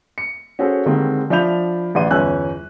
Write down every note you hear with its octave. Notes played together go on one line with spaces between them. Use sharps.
C#7
C#4 F#4 G#4 A4 C5
D3 D#3 G3 G#3 A#3 C4
F3 D4 E5 B5 G6 F7
A1 D5 F#5 C6 D#7
G1 E2 C#4 G#5 E6 F#6